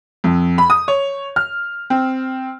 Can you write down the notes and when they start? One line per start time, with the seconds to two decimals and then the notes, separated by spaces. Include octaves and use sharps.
0.24 F2
0.58 B5
0.70 D#6
0.88 C#5
1.36 F6
1.90 C4